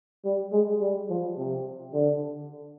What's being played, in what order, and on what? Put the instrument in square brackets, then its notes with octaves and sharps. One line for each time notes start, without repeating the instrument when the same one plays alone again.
[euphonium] G3
G#3
G3
F3
C3
D3